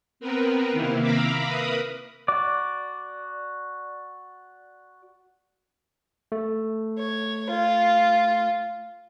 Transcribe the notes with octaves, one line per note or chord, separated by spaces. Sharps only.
B3 C4 A#4 B4
C3 D#3 A#3 E4
E5 F5 A#5 B5 D6
A#4 B4 B5 D#6
F#4 D5 D6
A3
C#5
F4